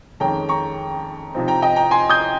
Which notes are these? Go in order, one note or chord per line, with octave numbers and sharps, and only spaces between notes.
F2 D#3 G#3 C#4 G5 A#5
A#5 C#6
C3 F3 C4 D#4
G5 A#5
D#5 G5
G5 A#5
G#5 C6
D#6 G6